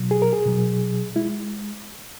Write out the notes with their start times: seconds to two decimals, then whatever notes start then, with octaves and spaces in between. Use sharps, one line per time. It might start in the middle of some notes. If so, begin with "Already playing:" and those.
Already playing: B2 F#3
0.11 G#4
0.22 A#4
0.33 G#4
0.46 B2 F#3
1.16 G#3 E4